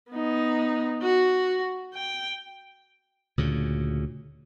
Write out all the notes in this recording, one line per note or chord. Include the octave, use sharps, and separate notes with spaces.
B3 D#4
F#4
G5
D2 A#2 C#3